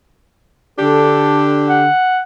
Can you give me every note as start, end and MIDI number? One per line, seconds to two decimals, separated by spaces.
0.79 1.87 50
0.79 1.87 62
0.79 1.87 67
0.79 1.44 69
1.69 2.21 78